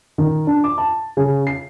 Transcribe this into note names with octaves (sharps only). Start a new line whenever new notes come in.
D#3
D4
D6
A5
C#3
C7